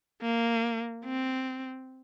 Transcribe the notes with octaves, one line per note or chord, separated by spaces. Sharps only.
A#3
C4